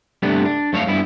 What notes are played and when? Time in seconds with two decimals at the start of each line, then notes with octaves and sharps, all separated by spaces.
0.23 G2 C3 A3 B3 D4
0.45 D4
0.73 F#2 A3 A4 C#5 F5
0.87 G2 B3 E4